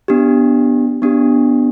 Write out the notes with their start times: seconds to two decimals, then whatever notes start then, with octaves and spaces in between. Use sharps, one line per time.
0.08 B3 D4 G4
1.02 B3 D4 G4